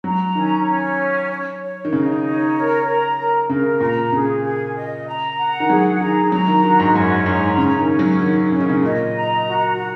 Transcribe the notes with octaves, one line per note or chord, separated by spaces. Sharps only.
F#3 A#5
D#3 C#4
C#4
C#5
C#5
C#5
D#3
C#3 D#4
C#5
A#4
A#5
A#4
C#3 A#4
A#2 A#5
C#3 G#4
G#4
D#5
A#5
F#5
D#3
F#3 G#4
D#3 A#5
F#3 A#5
D#3
D#3 F#4
G#2
F#2 C#4
G#2 A#5
C#3 C#4
D#3
C#4
F#3
D#3 C#4
C#3 C#4
D#3
C#3
A#2 D#5
A#5
F#4
F#4